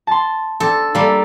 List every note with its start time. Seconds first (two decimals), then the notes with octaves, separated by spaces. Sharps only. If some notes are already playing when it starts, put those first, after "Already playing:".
0.07 A5 C6
0.60 C4 D4 A4
0.95 G3 A#3 D4 A4